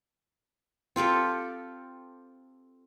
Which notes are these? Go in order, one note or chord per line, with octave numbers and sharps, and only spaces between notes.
C4 F4 G4 A4